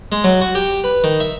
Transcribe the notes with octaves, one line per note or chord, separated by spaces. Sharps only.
G#3
F#3
F#4
G4
B4
D#3
E5